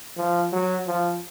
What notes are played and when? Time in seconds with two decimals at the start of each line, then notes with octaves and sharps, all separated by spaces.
0.17 F3
0.53 F#3
0.87 F3